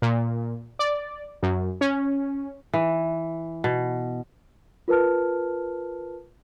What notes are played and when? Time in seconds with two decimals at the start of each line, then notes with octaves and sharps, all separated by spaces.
0.02 A#2
0.79 D5
1.43 F#2
1.81 C#4
2.73 E3
3.64 B2
4.88 F4 A#4 B4 A5 F6